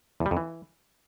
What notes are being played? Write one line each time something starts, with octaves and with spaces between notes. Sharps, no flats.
E2
G3
F2
E3